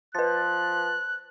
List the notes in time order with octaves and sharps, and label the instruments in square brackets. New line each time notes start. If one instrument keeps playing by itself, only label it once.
[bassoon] F3 [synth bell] B4 A6 [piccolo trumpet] F#6